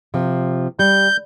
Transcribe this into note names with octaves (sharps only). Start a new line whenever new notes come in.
C3 F3
G3 G6